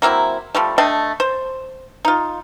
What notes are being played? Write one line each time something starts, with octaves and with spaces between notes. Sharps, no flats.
F#3 A#3 C4 E4
F3 G3 A3
A3 D4 D#5 G5
C5
D#4 F4